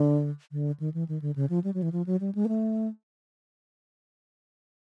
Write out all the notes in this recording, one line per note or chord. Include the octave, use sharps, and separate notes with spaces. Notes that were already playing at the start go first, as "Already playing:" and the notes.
Already playing: D3
D3
D#3
E3
D#3
D3
C#3
F3
G3
F#3
E3
F3
F#3
G3
G#3
A#3
A3